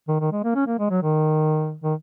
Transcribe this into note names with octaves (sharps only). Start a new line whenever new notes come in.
D#3
D#3
G#3
A#3
C#4
A#3
G#3
F#3
D#3
D#3